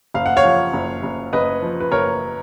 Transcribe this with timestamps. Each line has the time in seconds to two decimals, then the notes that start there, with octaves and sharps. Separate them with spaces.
0.14 F#1 F5
0.26 F#5
0.37 C#5 F5
0.44 F3
0.73 F#1
1.03 F#1
1.33 F#1 B4 D#5
1.62 F3
1.80 B4
1.91 F#1 A#4 C#5